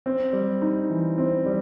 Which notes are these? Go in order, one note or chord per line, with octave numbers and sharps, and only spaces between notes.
C4
G3
D#4
E3
C4
G3